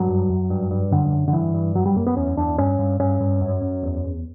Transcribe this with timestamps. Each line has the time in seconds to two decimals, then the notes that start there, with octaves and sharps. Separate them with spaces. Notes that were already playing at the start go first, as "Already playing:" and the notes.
Already playing: G2 F#3
0.08 F#2
0.30 F#2
0.50 G2
0.71 G2
0.91 F#2 D3
1.12 F#2
1.28 D3
1.33 G2 E3
1.54 G2
1.75 F#2 F#3
1.86 G3
1.96 F#2 A#3
2.07 B3
2.16 E2 C#4
2.37 E2 D4
2.58 G2 C#4
2.79 G2
2.99 G2 C#4
3.20 G2
3.41 F#2
3.62 F#2
3.83 E2
4.04 E2